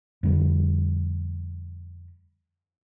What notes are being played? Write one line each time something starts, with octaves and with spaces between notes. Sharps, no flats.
F2 D3 G3